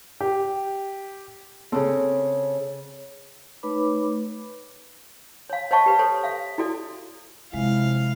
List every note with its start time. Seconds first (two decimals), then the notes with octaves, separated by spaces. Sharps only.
0.21 G4
1.72 C#3 C4 G#4 A4
3.63 A3 D#4 B4 C#5 B5 D6
5.50 C#5 F5
5.71 C5 C#5 D#5 F5 A5 C#6
5.86 G4 B4
5.99 A4 C5 C#5
6.24 E5 F5
6.58 E4 F#4 A4 D5
7.54 A2 C3 F3 G#3 E4 F5